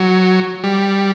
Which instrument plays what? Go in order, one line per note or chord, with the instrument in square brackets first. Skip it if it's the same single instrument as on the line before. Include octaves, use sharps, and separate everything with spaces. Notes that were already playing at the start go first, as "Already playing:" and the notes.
Already playing: [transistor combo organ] F#3
G3